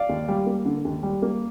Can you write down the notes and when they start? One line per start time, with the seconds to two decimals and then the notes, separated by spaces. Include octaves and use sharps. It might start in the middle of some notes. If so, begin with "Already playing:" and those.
Already playing: D5 F5
0.09 D#2
0.28 G3
0.46 A#3
0.65 D3
0.85 D#2
1.03 G3
1.22 A#3